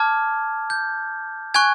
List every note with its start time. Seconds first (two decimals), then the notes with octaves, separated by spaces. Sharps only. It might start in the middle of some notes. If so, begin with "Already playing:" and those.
Already playing: A5 D6 F6 G#6
0.70 G6
1.54 G#5 C#6 F#6 G#6